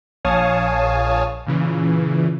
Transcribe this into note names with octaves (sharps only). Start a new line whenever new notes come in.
A#1 C#5 F5 G#5 A5 D#6
A#2 C#3 E3